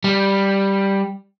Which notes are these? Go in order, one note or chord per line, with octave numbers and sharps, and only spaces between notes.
G3